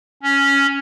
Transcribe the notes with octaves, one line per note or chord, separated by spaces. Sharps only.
C#4